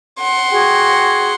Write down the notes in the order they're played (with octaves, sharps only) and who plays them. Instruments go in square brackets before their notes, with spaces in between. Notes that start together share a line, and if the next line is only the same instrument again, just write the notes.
[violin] F#5 C6
[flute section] F#4 G#4 G5